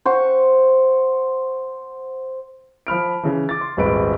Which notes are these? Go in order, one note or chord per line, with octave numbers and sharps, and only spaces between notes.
C5 F#5 C#6
F3 B5 F6 D7
C#3 E3
D6 A6
C6
D#1 G#1 G#3 B4 D7